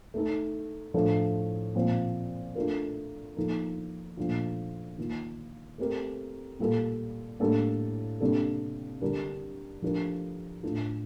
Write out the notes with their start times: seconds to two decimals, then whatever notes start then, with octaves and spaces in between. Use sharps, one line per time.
0.14 A3 D#4 A4
0.94 A2 F3 A3 D4 A4
1.75 A#2 F3 C4
2.55 A3 D4 F4 A#4
3.37 F3 A#3 D#4 A4
4.17 A#2 F3 A3 D4 F4
4.98 D#3 A#3 F4
5.78 A3 C4 G4 A#4
6.59 A#2 G3 A#3 F4 A4
7.40 A2 G3 A#3 D4 A4
8.20 C3 G3 A#3 D4 A4
9.01 D3 G3 D4 G4 A#4
9.82 F3 A3 D4 G4 A#4
10.63 A2 A3 D4 F4 A4